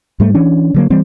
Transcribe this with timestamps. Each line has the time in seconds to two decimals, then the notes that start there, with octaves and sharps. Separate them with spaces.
0.20 G#2 G3 A3
0.34 E3 C#4 D4
0.74 D3 F#3 A#3
0.90 E3 G3 C4